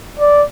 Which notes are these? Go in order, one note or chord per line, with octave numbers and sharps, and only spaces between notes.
D5